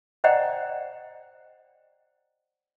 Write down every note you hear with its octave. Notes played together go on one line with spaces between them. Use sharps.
C5 D5 D#5 F#5 G5 A#5